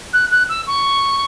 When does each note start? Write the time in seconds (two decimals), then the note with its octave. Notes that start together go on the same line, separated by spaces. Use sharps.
0.13 F#6
0.31 F#6
0.49 E6
0.67 C#6